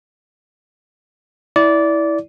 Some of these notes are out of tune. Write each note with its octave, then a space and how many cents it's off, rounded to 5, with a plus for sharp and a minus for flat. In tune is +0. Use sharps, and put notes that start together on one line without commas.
E4 -15 D5 -20